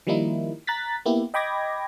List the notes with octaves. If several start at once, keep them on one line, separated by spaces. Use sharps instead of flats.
D#3 F3 G3 A#3 D#4 E4
A#5 F#6 A6 B6
A#3 B3 E4 G4
D#5 G5 B5 D6 G#6 A#6